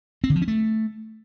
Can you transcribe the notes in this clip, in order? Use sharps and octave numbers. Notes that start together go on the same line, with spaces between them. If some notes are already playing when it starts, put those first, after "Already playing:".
C4
D3
F3
C#4
A3